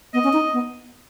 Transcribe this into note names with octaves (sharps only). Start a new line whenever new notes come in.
B3 D#5
C#4
D#4
B3